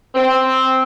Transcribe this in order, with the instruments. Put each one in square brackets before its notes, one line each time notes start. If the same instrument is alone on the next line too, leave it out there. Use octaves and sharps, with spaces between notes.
[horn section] C4